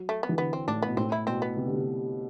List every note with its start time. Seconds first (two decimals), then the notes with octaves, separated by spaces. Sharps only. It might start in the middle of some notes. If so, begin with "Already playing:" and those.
Already playing: F#3
0.09 A3
0.23 B3
0.29 E3
0.38 D3 B3
0.53 C4
0.67 A2 D4
0.82 B3
0.88 B2
0.97 A2 C4
1.12 E4
1.27 B2 C4
1.42 B3
1.56 C3
1.66 D3
1.74 C3